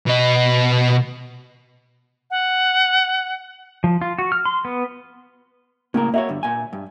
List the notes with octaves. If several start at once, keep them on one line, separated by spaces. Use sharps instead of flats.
B2 D#5
F#5
F3
F4
F#4
F6
C6
B3
A2 C#3 A#3 A#4
A#3 F#4 C#5 E5
G2 D3
A#2 G#5
G2